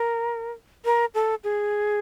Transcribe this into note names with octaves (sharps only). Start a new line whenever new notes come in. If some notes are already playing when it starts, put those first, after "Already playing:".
Already playing: A#4
A#4
A4
G#4